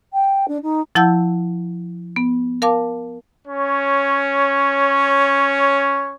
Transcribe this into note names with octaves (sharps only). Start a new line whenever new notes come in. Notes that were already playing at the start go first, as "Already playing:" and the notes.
G5
D4
D#4
F3 E4 F#5 A5 E6 G6
B3
A#4 F5 A5 D6
C#4 C#5